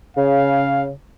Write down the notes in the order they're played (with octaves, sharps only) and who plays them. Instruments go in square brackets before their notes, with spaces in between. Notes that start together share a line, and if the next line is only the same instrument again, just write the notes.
[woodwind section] C#3 [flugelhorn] F5